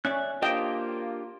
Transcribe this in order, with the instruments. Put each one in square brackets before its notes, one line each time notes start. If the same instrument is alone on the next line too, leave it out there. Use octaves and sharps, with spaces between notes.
[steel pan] C#4 [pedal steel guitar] D5 E5 F#6
[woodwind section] A#3 F4 [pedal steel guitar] D4 G4 C5 [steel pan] D#5 G5